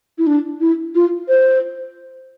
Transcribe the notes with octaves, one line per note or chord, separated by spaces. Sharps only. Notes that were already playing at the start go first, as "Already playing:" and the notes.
E4
D4
E4
F4
C5